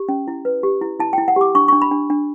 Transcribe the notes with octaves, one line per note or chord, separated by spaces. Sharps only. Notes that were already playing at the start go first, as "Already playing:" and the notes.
Already playing: G4
C#4
E4
B4
G4
E4
E4 A5
G5
E4
F#5
G4 D6
D4 C#6
C#6
D4
B5
D4
D4